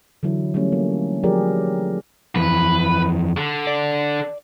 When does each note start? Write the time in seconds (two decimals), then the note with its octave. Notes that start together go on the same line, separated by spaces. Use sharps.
0.23 D3 E3 F#3 E4
0.54 F#3 G3 A3 C#4
0.72 A#3
1.23 F3 F#3 G4 G#4 A#4 D5
2.36 F2 E3 B4
3.37 D3
3.67 D5